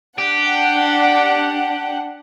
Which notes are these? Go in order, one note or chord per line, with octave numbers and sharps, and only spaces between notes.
D4 G4 F#5